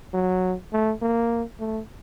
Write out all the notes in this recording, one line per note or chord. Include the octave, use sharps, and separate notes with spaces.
F#3
A3
A#3
A3